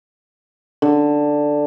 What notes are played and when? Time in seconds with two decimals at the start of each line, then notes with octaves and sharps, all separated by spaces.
0.82 D3